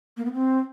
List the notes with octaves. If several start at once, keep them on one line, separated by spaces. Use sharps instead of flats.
A#3
B3
C4